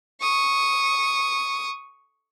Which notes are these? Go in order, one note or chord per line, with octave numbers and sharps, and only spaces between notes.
C#6 D#6